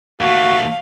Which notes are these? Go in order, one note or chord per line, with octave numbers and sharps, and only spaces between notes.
D#2 A3 F#4 F5